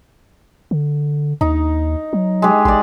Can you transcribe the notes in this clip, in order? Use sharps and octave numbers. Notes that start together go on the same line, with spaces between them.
D3
D#2 D#4
F#3
G#3 G4
A1 D5 C6